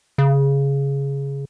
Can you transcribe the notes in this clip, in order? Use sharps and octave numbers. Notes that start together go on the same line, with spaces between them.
C#3